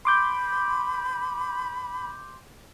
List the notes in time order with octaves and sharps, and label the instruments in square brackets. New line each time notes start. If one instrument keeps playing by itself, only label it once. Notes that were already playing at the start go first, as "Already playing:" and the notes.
[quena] B5 [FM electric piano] C6 D6 G6